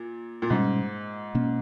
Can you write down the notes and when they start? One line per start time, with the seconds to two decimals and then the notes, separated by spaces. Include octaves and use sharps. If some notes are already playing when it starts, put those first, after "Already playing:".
Already playing: A#2
0.42 A#2
0.50 G#2 B2 G3 C#4
1.35 B2 A#3 C#4